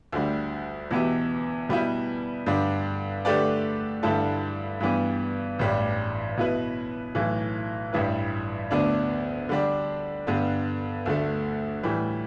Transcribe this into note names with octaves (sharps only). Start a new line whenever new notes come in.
D2 D3 G3
E2 B2 B3 G4 E5
B2 G3 B3 E4
G2 D3 G3 D4
D3 A3 G4 B4 D5
G2 D3 G3 E4 A4
G2 E3 G3 B3
A1 G2 G3 D4
B2 B3 E4 B4
B1 A2 E3
A1 G2 G3 E4 B4
D2 D3 B3 D4
D3 G3 D4
G2 D3 G3 B3
D2 D3 A3
A2 E3 G3